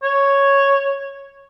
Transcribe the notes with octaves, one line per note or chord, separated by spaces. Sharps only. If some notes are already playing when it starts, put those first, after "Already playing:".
C#5